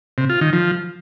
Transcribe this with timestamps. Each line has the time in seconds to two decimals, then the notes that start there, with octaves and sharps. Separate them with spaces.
0.18 C3
0.30 F4
0.41 D#3
0.53 F3